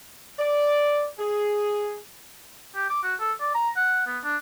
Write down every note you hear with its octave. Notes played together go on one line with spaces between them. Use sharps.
D5
G#4
G4
D6
F#4
A4
D5
A#5
F#5
B3
D4